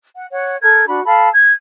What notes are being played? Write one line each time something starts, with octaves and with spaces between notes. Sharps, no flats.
F#5
C#5 F#5
A4 A#4 G#6
D4 F#4 B5
A4 F5 A5 B5
G#6